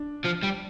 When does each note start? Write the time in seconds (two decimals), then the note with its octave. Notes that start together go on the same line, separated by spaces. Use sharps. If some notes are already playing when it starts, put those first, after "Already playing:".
Already playing: D4
0.25 F3
0.44 G3